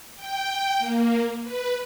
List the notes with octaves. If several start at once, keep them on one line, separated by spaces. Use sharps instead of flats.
G5
A#3
B4